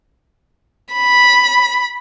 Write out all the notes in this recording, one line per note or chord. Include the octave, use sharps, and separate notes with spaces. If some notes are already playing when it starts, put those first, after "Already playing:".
B5